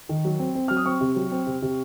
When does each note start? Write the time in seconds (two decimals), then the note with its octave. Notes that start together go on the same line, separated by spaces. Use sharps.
0.09 D#3
0.25 F#3
0.39 C4
0.55 C4
0.68 F#3 F6
0.77 D#6
0.86 C4 C#6
1.01 C3
1.16 F#3
1.32 C4
1.47 C3
1.62 C3